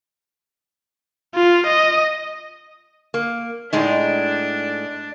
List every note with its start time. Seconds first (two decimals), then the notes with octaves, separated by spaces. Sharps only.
1.35 F4
1.67 D#5
3.14 A#3
3.73 A2 G#3 D4 D#4